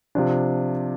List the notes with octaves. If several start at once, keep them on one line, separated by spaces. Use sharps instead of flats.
C3 F3 D4